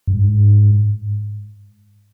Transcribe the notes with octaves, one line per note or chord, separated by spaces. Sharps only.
G2
G#2